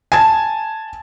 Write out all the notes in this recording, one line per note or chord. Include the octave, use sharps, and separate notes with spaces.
G#5 A5